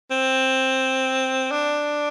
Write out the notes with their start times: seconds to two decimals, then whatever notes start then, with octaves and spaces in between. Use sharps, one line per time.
0.11 C4
1.51 D4